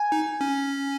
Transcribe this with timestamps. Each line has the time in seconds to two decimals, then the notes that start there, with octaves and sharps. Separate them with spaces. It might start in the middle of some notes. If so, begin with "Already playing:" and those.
Already playing: G#5
0.12 D#4
0.41 C#4